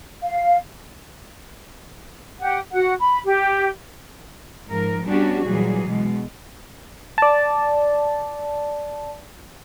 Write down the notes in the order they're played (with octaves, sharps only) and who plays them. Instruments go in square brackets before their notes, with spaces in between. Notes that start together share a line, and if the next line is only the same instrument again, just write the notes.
[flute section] F5
G4 F#5
F#4 F#5
B5
G4
[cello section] G#2 F3 A#4
G3 B3 C#4 D4 F#4 G4
A#2 E3 F#3 G3 G#4
B2 G#3
[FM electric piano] D5 A5